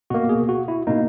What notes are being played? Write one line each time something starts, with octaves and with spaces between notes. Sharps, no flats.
B2 A#3 F#4
G#4
F#4
E4
B2 A#3 D#4